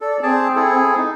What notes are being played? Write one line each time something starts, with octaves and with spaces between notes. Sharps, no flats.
A4 D5
C4 G#4 D5 A5
E4 G#4 A4
D#4